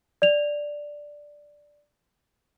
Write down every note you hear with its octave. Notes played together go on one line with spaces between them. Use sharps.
D5 F7